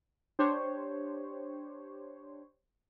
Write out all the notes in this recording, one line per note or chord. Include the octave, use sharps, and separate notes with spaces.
D4 G4 C5 C#5